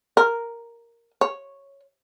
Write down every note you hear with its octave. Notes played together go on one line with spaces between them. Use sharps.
A#4
C#5